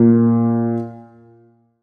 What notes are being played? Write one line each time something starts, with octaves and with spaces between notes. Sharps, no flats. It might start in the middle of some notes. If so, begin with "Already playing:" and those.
Already playing: A#2 A#3